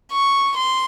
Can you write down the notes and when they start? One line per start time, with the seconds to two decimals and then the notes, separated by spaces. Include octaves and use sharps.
0.12 C#6
0.57 C6